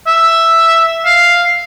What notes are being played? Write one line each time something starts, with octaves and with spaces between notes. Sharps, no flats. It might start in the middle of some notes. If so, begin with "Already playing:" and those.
E5
F5